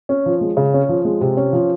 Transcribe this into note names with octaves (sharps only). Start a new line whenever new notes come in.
C#4
F3
G#3
C#3
C#4
F3
G#3
C3
C#4
F3